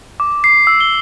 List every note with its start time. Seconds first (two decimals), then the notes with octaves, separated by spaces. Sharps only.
0.20 D6
0.44 C7
0.67 E6
0.81 G7